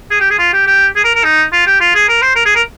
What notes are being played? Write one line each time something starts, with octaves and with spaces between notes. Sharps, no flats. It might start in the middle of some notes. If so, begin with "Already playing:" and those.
G#4
G4
G#4
F4
G4
G4
G#4
A#4
A#4
D#4
F4
G4
F4
G#4
A#4
C5
A#4
G#4
A#4